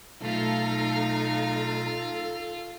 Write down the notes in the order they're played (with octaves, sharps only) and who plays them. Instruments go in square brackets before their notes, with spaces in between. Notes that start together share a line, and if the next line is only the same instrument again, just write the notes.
[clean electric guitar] B1 A3 [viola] D#4 [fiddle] F4 F5 [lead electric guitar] A4